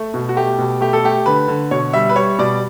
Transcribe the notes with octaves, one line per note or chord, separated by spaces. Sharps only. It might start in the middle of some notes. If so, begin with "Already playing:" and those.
Already playing: A3
B2
F#4
A3 G4
B2
A3 G4
A4
A3 G4
D3 B4
D3
B2 C#5
G3 E5
B4
G3 C#5
B2 D5